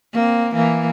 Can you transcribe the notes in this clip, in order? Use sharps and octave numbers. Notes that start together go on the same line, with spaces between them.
A#3 C4
E3 A#3